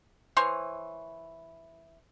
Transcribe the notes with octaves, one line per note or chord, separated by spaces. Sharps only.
E3 C5 C#5 C6